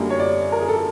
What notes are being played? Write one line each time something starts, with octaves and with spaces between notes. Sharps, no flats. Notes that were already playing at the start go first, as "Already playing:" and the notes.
Already playing: F#2 D3 G3 A#3
C#5
D5
A#4
G#4
A4